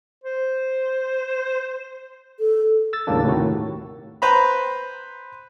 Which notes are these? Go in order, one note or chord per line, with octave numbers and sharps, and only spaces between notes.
C5
A4
E6 A6
D#2 A2 C#3 G3 A#3 D4
A2 C3 D#3 F#4
B4 C5 A#5 B5